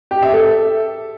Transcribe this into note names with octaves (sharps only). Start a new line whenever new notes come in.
G4
E5
A4